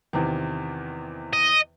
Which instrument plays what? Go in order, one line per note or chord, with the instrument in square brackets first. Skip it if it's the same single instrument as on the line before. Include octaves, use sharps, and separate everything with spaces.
[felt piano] E2 C3 D#3
[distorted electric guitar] D#5